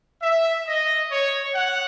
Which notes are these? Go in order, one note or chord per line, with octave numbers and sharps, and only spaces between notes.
E5
D#5
C#5
F#5